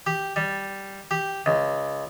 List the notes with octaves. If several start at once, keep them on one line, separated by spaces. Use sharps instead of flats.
G4
G3
G4
C#2